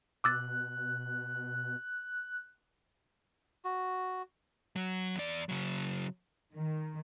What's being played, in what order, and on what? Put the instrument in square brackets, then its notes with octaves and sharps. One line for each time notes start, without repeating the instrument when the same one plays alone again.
[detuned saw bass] B2 [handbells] D6 E6 A6 [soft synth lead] F#6
[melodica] F#4
[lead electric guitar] F#3
E2 D5
C#3 F#3
[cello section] D#3